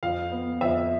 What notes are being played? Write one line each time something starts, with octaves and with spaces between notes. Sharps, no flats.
F2 F5
B3
F2 E5